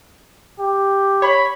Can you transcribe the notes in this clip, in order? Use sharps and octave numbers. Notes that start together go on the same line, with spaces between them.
G4
C#5 B5